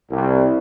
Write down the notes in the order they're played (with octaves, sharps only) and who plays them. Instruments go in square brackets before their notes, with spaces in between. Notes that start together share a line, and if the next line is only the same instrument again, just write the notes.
[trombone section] C2